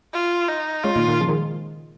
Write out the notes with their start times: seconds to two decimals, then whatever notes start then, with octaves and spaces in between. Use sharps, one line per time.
0.14 F4
0.48 D#4
0.84 G#3 C#4 F4
0.96 A#2 D#3
1.08 A#2 D#3
1.20 C#3 F3
1.28 D#3 G#3